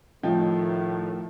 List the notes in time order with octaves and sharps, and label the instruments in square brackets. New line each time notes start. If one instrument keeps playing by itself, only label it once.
[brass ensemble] A2 D#3 A3 [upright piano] F3 D#4 G5